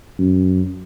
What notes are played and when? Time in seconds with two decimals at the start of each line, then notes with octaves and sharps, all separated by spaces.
0.18 F#2